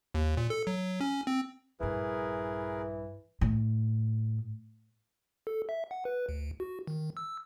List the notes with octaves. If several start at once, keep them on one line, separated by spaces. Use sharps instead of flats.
D#2
A#2
A4
F#3
C#4
C4
A#1 G2 E3 G#4 A#4 B4
A2
A4
E5
F#5
B4
D2
F#4
D#3
E6